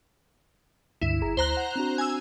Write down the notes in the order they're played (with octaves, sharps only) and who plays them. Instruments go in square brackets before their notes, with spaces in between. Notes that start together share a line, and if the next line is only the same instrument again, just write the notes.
[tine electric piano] C#2 G2 D3 [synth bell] E4
[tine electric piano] G1 G#4 A#5
[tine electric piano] D2 [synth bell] C5 A#5 F#6
[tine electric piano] F#5
C4 D4 F#4
[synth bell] G#5 E6